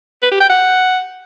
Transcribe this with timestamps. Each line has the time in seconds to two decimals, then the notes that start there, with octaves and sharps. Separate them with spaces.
0.22 B4
0.31 G4
0.40 G5
0.49 F#5